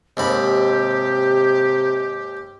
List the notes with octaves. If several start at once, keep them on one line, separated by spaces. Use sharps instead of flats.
D#2 G#2 C3 G4 B5